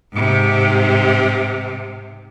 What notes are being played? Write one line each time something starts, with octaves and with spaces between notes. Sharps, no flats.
G#2 C3